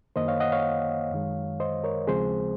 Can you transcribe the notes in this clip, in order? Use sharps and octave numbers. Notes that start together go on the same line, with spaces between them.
F#2 D#3 A#3 C5 D#5
C#5 F5
D#5 F#5
C#5 F5
F#2 D#3 G#3
C5 D#5
A#4 C#5
D#2 C#3 F3 G#3 C4 G#4 C5